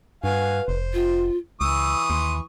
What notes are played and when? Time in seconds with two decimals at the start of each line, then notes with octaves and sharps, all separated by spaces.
0.24 G2 F#4 B4 F5 G#5
0.68 F1 C5
0.94 F4
1.61 C#2 E3 C#6 D#6 E6
2.10 D#2 C6